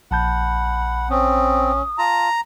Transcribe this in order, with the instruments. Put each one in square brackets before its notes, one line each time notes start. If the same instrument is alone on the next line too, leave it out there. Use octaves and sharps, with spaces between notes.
[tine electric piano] A#1 A5 G6 [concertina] F#5 [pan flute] B5
[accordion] C4 [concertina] C#4 [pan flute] D#6
[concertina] F4 A5 [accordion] A#5